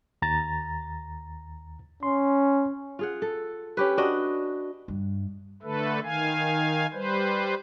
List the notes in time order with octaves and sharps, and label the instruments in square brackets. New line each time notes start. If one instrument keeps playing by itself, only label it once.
[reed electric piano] D#2 A#5 A6
[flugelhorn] C#4 [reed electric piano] C6
[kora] F4 G#4 F#5
A4
C#4 G4 B4
D4 F#4 D#5
[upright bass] G2
[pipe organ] D3 A3 A4 B4
D#3 F5 G#5
G3 B4 C5